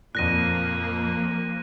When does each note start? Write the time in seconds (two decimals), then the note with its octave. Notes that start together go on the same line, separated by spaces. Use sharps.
0.15 F2 A#2 F3 A#3 F#6 A#6 D#7